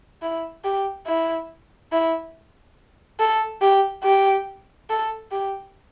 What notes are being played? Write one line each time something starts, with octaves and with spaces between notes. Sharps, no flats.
E4
G4
E4
E4
A4
G4
G4
A4
G4